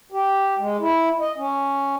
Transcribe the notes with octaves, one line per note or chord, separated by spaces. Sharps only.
G4
G#3
E4
D#5
C#4